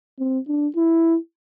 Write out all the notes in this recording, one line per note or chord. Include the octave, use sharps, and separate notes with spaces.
C4
D4
E4